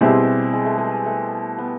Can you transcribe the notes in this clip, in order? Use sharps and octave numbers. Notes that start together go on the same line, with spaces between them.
B2 G3 G#3 C4 E4 G4
G#3
A3
G#3
A3
B3